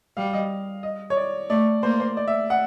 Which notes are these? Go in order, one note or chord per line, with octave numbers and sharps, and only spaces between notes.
G3 F5
D#5
D#5
C#5
D5
A3 D5
A#3 C5
C5
D5
E5
F#5